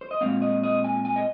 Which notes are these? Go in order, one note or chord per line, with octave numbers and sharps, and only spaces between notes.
C5
D#5
A#2 G#3 C4 F5
D#5
D#5
G#5
G#5
D#5